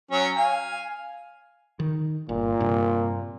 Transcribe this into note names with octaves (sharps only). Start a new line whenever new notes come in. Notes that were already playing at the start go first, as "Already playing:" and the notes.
F#3 C#4
F5 G#5
D#3
G1 A#2
G2 C3